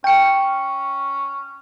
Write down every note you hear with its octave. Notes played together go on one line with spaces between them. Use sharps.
C#4 G5 C#7